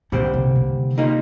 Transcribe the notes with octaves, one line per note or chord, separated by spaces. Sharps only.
D#2 A#2 D3 G3 C4
C3
C3
A#2 G3 A#3 D#4